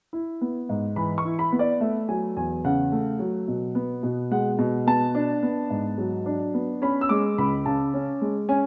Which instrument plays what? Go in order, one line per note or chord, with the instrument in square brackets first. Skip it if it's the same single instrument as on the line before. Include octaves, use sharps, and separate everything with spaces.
[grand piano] E4
B3
G#2
E3 B5
C#6
E4
B5
B3
D5
A3 E5
F#3 G#5
E2 G#5
C#3 F#5
A3
F#3
B2
B3
B2
G#3 F#5
B2
B3 A5
D4
B3
G#2
F#3
D4
B3
C#4 B5
E6
G#3 D6
C#2 B5
C#3 A5
C#4
G#3
C#4 G#5